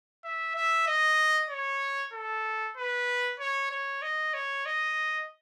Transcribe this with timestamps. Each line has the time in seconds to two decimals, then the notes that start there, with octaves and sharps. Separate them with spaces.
0.24 E5
0.56 E5
0.87 D#5
1.50 C#5
2.13 A4
2.77 B4
3.40 C#5
3.71 C#5
4.02 D#5
4.34 C#5
4.66 D#5